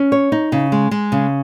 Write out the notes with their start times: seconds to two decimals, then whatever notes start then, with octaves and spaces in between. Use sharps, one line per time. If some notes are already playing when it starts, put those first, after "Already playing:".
Already playing: C#4
0.12 C#5
0.32 D#4
0.52 C#3
0.72 G#3
0.91 G#3
1.12 C#3